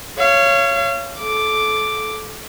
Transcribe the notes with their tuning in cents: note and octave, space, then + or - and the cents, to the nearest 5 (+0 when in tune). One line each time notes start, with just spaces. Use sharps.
C#5 +0 F5 -35
A4 -25 D6 +0